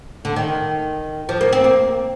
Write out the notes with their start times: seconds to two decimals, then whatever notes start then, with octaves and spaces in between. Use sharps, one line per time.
0.25 D3
0.36 D#3
1.29 F3
1.41 A#3
1.53 C4
1.64 A#3